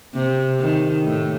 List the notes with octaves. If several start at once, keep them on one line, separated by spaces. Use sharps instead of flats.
C3
D#3
A2